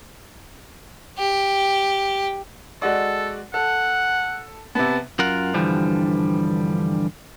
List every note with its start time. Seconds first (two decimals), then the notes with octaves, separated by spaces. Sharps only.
1.18 G4
2.82 G#3 F#4 A4 D5
3.54 A4 F#5
4.75 C3 B3 A5
5.19 F#2 F4 A#4 F#5
5.54 G2 D3 E3 F3 G3